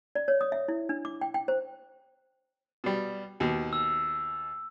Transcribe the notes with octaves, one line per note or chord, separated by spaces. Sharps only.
D5
C#5
D#6
E5
E4
D4
D6
G5
G5
C5
B2 G3
D#2 B2
E6